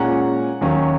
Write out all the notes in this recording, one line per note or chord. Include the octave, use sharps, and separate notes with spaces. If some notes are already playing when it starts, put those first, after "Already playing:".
Already playing: A#2 G#3 C#4 F#5 A#5
D#2 D#3 F#3 C#4